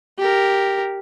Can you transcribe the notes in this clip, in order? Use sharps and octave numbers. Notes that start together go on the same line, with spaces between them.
G4 A#4